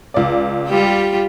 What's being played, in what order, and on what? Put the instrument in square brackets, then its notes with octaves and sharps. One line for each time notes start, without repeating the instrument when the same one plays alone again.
[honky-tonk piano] C#2 D5
[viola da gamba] G3 F4 G4